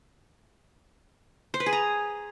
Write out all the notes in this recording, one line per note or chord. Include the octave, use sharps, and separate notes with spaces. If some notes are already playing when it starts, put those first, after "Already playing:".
C5
B4
G#4
A#5